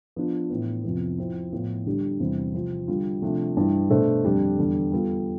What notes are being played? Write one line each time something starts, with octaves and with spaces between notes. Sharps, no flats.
F3 B3 D4 F4
A2 E3 B3
F2 C3 F3 B3
F3 C4 E4
A2 F3 B3 F4
D3 G3 D4 G4
E2 C3 G3 C4 E4
C3 F3 C4
D3 G3 D4 F4
C3 F3 A3 D4
G2 E3 G3
B2 A3 D4 A4 C5
F2 D3 G3 D4 G4
E2 D3 G3
G3 B3 F4 A4